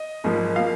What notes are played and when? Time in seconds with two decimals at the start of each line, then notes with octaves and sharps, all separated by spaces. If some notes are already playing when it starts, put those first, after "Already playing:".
Already playing: D#5
0.24 G#1 G#2 F3 A#3
0.56 F3 A#3 F5